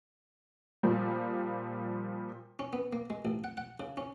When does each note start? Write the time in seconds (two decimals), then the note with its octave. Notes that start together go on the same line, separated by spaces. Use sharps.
0.83 A#2 F3 G3
2.59 C#4
2.73 B3
2.93 A#3
3.10 G#3
3.25 A1
3.44 F#5
3.57 F#5
3.80 C#3
3.97 C#4